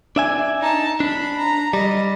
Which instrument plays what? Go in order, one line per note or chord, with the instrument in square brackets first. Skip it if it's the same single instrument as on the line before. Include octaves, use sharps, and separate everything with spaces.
[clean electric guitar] D4 E5 G#5
[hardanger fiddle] D#4 A5
[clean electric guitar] D4 [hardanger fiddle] B5
[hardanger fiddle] A#5
[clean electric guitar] G3 [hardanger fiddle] D#5